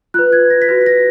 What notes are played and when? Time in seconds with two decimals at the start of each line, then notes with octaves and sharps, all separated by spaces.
0.14 F4 B4 F#6
0.33 G#6
0.50 A#6
0.62 B6
0.69 F#4 B4 A#6
0.81 B6
0.86 A#6